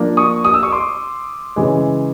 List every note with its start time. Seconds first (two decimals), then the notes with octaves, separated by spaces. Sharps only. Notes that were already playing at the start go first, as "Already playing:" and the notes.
Already playing: F3 A#3 D4
0.17 C#6 D#6
0.45 D#6
0.54 E6
0.63 C#6 D#6
0.72 C6 D6
1.56 C#3 E3 G#3